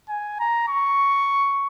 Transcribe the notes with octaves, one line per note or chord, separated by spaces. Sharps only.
G#5
A#5
C#6